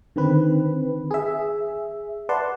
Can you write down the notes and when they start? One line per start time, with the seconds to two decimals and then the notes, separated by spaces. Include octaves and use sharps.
0.16 D3 D#3 C4 B4
1.11 G#4 E5
2.29 B4 D5 F#5 A5 C6